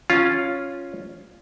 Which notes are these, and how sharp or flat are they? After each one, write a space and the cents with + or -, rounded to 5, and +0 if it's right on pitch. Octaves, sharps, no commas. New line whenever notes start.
C#4 +0 F4 +0